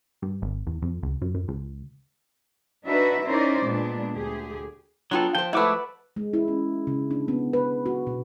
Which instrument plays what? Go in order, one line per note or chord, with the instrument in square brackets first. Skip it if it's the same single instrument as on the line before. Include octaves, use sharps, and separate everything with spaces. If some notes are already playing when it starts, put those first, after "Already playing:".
[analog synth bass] G2
G#1
E2
F2
C#2
F#2
F#2
C#2
[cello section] D4 D#4 F#4 B4 E5
C#4 D#4 E4 A#4 C5 D5
A#2 G#3 B3 D4
D2 G4 G#4
[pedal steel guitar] F#3 B3 A4 [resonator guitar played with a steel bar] D4 F4 G5
[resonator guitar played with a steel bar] F3 C5 [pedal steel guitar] G5 [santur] A5
[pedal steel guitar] G#3 D6 E6 [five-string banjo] A3 E4 [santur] B4 F#5
[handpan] G#3
E4
C#4
C#3
D4
B3
B4
F#4
B2